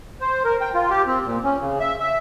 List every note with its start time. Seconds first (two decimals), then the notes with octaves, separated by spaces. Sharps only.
0.21 C5
0.45 A#4
0.61 G5
0.74 F4
0.90 G4
1.07 C4
1.25 A#2
1.44 C#4
1.60 C#3
1.80 E5
2.00 E5